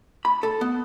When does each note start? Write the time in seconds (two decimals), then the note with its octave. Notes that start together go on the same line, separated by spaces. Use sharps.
0.25 B5
0.43 A4
0.61 B3